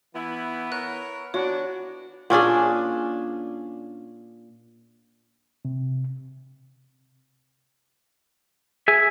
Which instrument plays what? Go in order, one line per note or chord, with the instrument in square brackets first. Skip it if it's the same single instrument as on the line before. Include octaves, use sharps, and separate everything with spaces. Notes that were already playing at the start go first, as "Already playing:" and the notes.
[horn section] E3 E4 [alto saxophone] B3
[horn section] A#4 B4 C#5 [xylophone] F#6
[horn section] E3 B3 D4 [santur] F#4 [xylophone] C#5
[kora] A#2 C#4 D4 G#4
[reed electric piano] C3
[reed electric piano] G#4 [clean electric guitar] E5 G#5